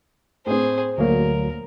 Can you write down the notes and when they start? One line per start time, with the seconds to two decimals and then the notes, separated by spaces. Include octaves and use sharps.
0.46 A2 C4 G#4 C5
0.98 D2 A#2 F#3 A#3 A#4